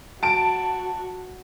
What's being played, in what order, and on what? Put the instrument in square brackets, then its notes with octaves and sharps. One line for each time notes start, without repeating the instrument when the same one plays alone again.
[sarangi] F#4 [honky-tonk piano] A5 D7